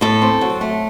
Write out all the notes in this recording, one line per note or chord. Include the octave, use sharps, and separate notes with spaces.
A2 A4
C4
F#3
A3